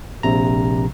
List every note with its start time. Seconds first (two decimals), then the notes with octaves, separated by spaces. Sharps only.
0.23 A#1 C3 A#5